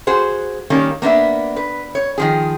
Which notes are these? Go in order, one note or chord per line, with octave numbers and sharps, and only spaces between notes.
F#4 G#4 C5
D#3 G3 A#3 C#4
A#3 B3 D4 E5
B4
C#5
D#3 F3 G#4